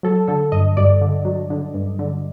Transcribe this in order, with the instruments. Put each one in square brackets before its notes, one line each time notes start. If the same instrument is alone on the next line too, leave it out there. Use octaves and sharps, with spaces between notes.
[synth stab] F#3 A4
D3 A4
G2 D#5
G2 D5
D3
F#3
D3
G2
D3